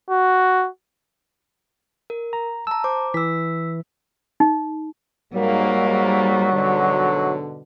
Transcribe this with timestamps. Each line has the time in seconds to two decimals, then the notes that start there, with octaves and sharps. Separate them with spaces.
0.10 F#4
2.10 A#4
2.33 A#5
2.67 A5 A#5 E6
2.84 C5 D6
3.14 E3 E6 B6
4.40 D#4
5.33 G#2 F#3 G3 A#3
6.52 G#2 B2 D3